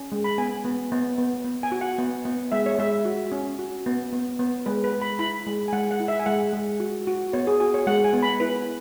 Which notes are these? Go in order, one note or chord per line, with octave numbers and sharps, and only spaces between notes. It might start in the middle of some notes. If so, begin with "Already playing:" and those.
Already playing: C#4
G#3
B5
B3 G#5
B3
B3
B3
B3
G#5
F#4
F#5
B3
B3
G#3 E5
C#5
G#3 E5
F#4
C#4
F#4
B3
B3
B3
G#3 B4
B4
G#3
B5
E4 B5
G#3
G#5
G#3 F#5
F#5
E4
E5
G#5
G#3 F#5
G#3
F#4
F#4
B3 C#5
G#4
F#4 G#5
C#5
G#3 F#5
G#5
B3
B5
E4 B4